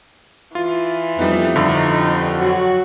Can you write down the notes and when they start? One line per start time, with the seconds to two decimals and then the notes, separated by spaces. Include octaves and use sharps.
0.55 E3 F4
1.19 F2 G3 B3 D#4
1.56 G2 D3
1.98 G4
2.36 F#3 F#4